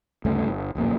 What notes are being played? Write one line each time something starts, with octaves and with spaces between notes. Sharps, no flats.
D2 G2 C#3 A3
G1
D1 A#1 F#2 A#3